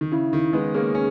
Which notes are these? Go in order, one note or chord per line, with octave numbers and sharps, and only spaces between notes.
D#3
C#3 E4
D#3
G#3 B3
A#3 C#4 G#4
A#3 C#4